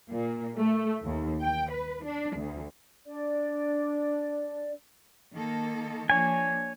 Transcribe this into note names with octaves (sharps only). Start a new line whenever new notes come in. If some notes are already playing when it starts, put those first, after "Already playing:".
A#2
A3
D#2
G5
B4
D4
D2
D4 D5
D#3 A#3 A4
F3 A#3 D4 C#5 G#5